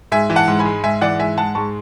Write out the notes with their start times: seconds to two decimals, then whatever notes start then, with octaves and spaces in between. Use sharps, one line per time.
0.12 G#2 E5 G#5
0.30 E3
0.36 F#5 A5
0.48 G#2
0.59 G#5 B5
0.65 G#3
0.83 G#2 E5 G#5
1.01 E3 D5 F#5
1.19 G#2 E5 G#5
1.37 G#3 F#5 A5
1.55 G#2 A5 C#6